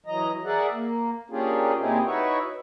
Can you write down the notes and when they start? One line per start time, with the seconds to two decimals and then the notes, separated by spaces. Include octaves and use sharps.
0.06 E3 F#3 D#5 A#5
0.45 G#4 A#4 D5 E5 F#5
0.72 A#3
1.30 A#3 C#4 D4 F4 G4 G#4
1.78 A#2 C4 D#4 E4 G4 G#4
2.05 D#4 E4 F#4 B4 C#5 E5